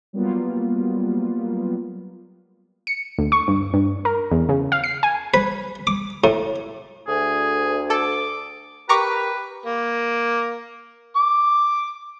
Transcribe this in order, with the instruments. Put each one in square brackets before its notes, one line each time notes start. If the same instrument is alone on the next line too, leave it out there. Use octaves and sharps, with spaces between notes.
[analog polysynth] F#3 G3 A#3 B3 F4
[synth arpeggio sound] C#7
D2
C#6
G2
G2
A#4
E2
C#3
F5
C7
G#5
[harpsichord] B4
D6
A2
[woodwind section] D2 [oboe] G#4
[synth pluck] A4 [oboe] D6
[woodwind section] G4 A#4 [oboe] B4 [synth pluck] A#5 C#6 D6
[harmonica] A#3
D6